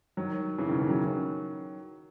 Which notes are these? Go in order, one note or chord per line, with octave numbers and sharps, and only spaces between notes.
D#3 F#3
C#3 E3
B2 D#3
C#3 E3
D#3 F#3